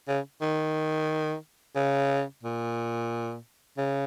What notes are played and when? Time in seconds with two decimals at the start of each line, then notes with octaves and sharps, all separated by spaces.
0.08 C#3
0.41 D#3
1.75 C#3
2.43 A#2
3.77 C#3